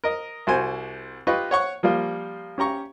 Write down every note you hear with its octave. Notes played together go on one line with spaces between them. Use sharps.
A#4 D#5
C2 F#4 C5 G#5
F4 G4 B4 D#5 C#6
C#5 F#5 C#6
F3 G3 A#3 F4
C#4 G4 A#5 C#6